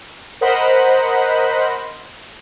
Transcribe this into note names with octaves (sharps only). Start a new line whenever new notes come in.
A#4 C5 D#5 F#5 B5